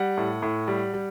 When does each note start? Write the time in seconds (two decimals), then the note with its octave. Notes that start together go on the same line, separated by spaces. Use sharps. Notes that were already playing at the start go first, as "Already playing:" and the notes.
Already playing: G3 F#5
0.17 A2
0.42 A2
0.68 G3
0.94 G3